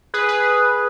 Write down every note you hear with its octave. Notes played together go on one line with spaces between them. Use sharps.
G#4 B4
G#4 B4